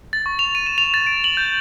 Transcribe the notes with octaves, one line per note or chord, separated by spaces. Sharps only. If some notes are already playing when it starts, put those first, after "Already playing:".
A6
C#6
F7
D#7
E7
F7
A6
D7
F#7
G6